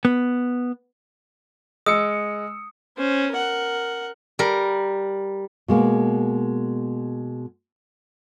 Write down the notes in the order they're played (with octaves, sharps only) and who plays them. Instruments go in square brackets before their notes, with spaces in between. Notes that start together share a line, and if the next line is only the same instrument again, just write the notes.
[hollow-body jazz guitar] B3
[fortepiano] G#3 [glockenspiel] D#6 [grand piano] E6 C#7
[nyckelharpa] C#4 C5
A#4 F#5
[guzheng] G3 A#4
[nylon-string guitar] B2 G#3 A#3